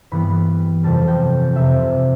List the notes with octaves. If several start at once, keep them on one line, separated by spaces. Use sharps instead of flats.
G2 E3 G3 B3 B5
F2 C3 G3 A5
G5
F2 C3 G3 E5